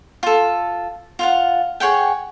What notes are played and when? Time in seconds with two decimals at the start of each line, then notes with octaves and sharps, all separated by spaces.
0.23 F4 A4
1.19 F4 F5 F#5
1.80 G#4 C#5 F#5 G5